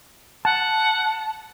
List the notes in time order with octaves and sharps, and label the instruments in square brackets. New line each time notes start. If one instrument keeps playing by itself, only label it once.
[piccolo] F#5 [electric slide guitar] A5